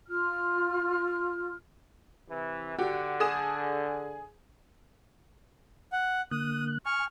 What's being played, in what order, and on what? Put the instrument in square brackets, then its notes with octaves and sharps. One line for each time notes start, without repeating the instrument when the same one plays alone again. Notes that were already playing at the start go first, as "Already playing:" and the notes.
[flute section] F4 F6
[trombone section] C3 E3
[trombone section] D3 [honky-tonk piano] F#4 G4
[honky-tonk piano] G#4 D#6 E7
[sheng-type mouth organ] F#5
[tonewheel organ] D3 A#3 F#6 [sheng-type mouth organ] D#6
[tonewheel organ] G#5 [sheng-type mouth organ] C#6 F6